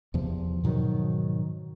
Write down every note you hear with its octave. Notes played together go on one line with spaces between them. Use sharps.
E2 C3 F3
G#2 B2 D#3 F#3